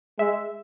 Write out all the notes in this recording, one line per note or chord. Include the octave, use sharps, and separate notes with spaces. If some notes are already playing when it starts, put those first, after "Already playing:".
G#3 E5